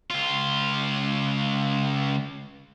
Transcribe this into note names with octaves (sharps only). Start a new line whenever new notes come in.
C#2 F4